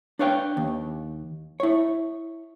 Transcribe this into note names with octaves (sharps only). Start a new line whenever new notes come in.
D4 B4 C#5 F5 G5
D#2
E4 C#5